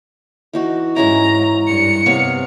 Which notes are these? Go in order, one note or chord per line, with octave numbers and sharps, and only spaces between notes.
E3 D#4 F#4
G#2 G#3 C#4 E4 A#5
G2 C#7
C3 B3 C#5 F5